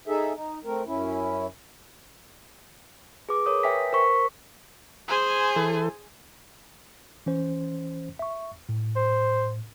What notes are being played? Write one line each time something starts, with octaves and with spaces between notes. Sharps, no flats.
D#4 G#4 A4 E5
D#4
A3 C4 A#4
F#2 C#4 E4
G#4 B4 D6
A#4 C#5 D#6
B4 E5 G5 G#5 B6
A#4 C5 C#6 B6
G#4 C5 G#5
E3 A4
E3 C#4 C5
E5 C#6
A2
C5